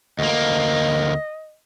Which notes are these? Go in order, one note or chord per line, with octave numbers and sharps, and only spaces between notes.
D2 A#3 D#5